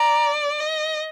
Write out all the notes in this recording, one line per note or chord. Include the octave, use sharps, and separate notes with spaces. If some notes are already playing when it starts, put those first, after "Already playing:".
Already playing: D5 A#5
D#5